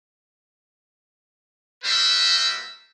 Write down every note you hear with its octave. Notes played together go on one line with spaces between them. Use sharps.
G3 A#3 F#4 B4 C5 E5